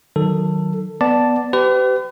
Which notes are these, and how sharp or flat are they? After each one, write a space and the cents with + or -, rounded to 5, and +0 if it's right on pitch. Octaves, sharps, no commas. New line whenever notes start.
D#3 +0 F#3 +0 A4 +15
B3 +0 D5 +0 A5 +0
G4 -25 B4 +40